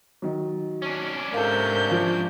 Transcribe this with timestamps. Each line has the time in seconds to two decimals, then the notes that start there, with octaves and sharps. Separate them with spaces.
0.22 D#3 F#3
0.82 C#4 D4
1.33 G#2 C3 A4 A#4 F5 G6
1.88 F3 F5